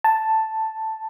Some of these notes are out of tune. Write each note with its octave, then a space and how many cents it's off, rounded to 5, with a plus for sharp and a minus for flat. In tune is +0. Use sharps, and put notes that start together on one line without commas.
A5 +5